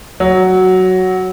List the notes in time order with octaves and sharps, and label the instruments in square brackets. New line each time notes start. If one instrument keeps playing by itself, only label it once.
[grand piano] F#3